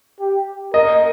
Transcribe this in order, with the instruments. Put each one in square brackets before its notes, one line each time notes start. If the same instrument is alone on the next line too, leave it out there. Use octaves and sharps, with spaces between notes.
[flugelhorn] G4
[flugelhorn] A#4 [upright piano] D#5